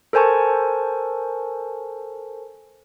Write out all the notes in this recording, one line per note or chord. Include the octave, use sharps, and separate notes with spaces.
A4 A#4 C5 G#5 A5 C#6